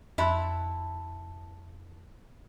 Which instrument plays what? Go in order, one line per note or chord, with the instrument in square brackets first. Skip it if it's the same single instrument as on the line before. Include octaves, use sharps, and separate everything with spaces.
[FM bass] F2 [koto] E4 [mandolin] A4 A5 F#6 [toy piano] E5 B5 C6